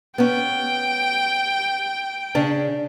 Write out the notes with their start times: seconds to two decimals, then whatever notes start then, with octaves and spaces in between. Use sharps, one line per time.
0.18 B3 C#4 G5
2.35 C#3 C#4 D4